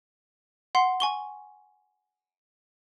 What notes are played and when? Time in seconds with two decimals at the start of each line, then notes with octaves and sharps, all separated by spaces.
0.75 F#5 C6 C7
1.00 G#5 C#6 G7